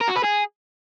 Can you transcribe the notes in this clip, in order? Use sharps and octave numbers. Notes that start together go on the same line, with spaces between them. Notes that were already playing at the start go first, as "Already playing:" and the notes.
A#4
F#4
B4
G#4